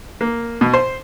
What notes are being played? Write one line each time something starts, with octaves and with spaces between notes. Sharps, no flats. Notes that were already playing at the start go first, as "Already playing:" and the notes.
A#3
B2
C5